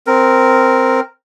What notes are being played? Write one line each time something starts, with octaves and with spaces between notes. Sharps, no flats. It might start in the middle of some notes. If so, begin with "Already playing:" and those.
C4 A#4